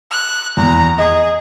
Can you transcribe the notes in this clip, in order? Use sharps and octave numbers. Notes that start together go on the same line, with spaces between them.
F#6
E2 A#5
G#4 D#5